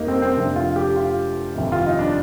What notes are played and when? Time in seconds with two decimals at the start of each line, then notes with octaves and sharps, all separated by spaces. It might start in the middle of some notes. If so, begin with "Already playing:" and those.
Already playing: F1 F2 G3 A#3 D#4
0.08 C4
0.22 C4
0.36 F1 F2 C3 D4
0.56 F4
0.76 G4
0.96 F4
1.54 G1 F2 C3 D#3
1.72 F4
1.86 D#4
1.99 D4